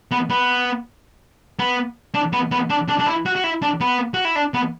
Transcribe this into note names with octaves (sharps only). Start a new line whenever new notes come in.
B3
B3
B3
D4
B3
B3
D4
D4
D4
E4
F#4
F#4
E4
D4
B3
F#4
E4
D4
B3